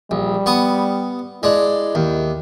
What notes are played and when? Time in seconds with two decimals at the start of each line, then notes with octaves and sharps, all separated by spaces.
0.11 A#1 G3
0.46 B3 C#6 D#6
1.43 G#3 D4 E4
1.95 D#2